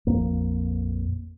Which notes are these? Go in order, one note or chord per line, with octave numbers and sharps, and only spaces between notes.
A#1 F2 A#3